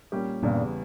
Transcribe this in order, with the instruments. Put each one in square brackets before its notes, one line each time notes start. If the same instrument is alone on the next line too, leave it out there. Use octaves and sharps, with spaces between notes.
[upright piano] A#2 G3 C#4 G4
[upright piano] E2 C#3 G3 [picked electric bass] G2 A#2